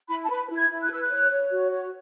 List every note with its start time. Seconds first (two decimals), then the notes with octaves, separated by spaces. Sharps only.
0.09 E4 B5
0.24 A5
0.29 B4 B5
0.50 E4
0.56 G#6
0.70 E4
0.83 F#6
0.90 B4 E6
1.02 F#6
1.10 C#5
1.30 C#5
1.50 F#4
1.70 C#5